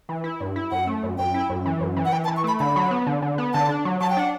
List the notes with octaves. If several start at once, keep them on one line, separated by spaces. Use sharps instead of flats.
E3
E4
G2
E4
F#2 F#5
A3
F#2
F#2 G5
E4
F#2
E3
F#2
E3
F#5
E3 G5
A5
E3
C#6
A3 B5
D3 B5
F#3
B3
D3
D3
B3
D3 A5
D4
F#3
F#3 A5
G5
D4 F#5